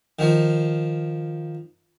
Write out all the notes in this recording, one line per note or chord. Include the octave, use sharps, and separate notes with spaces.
D#3 F3